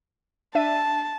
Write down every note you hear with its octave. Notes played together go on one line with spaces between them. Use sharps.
D4 E5 A5 D#7